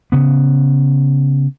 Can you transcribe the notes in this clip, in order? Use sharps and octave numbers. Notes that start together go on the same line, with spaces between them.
C#3 B3